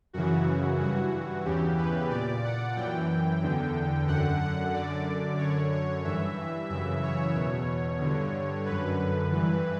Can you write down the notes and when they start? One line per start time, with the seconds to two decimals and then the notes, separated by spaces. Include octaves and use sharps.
0.13 F#2 C#3 E3 F#4
0.80 G2 E3 F#4
1.45 E2 C#3 E3 G4
1.78 B4
2.10 A#2 D5
2.44 F#5
2.76 F#2 E3 G5
3.42 E2 D3
4.07 F#2 D3 F#5
4.40 F#5
4.73 F#2 D3 D5
5.38 F#2 D3 C#5
5.72 C#5
6.04 G2 E3 E5
6.69 F#2 C#3 E3 E5
7.03 C#5
7.35 E2 B2
8.00 G2 D3
8.66 F#2 D3 B4
9.32 G2 E3